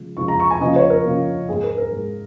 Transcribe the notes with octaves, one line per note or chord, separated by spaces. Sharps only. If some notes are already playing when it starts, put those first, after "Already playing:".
Already playing: C#3 F3 G#3
C#3 F3 G#3 C#6
A#5
C#6
G#5
C#3 F3 A#3 D#5
C#5
A#4
C#3 F3 A#3
G#2 G#3 G#4
A#4
A#4
G#2 G#3